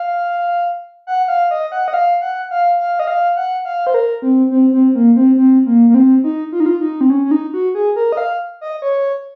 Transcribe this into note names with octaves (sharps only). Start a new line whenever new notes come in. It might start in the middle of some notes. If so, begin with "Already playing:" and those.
Already playing: F5
F#5
F5
D#5
F#5
D#5
F5
F#5
F5
F5
D#5
F5
F#5
F5
C5
A#4
C4
C4
C4
A#3
C4
C4
A#3
A#3
C4
D#4
F4
D#4
F4
D#4
C4
C#4
C#4
D#4
F#4
G#4
A#4
D#5
F5
D#5
C#5